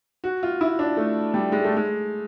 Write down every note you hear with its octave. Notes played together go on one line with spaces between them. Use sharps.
F#4
F4
E4
D4
A3
G3
G#3
A3
G#3